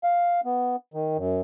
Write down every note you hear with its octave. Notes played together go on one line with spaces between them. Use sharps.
F5
B3
D#3
F#2